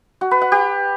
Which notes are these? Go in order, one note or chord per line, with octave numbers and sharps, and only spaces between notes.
F#4
B4
F#5
G4